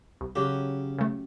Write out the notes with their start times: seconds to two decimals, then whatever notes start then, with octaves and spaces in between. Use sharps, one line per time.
0.21 C2
0.36 C#3 F#3 C#4 G4
0.99 C#3 A3